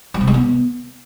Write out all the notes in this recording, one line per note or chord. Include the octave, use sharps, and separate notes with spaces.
G3
C3
G#3
B3